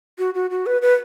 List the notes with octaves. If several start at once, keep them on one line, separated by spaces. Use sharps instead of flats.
F#4
F#4
F#4
B4
B4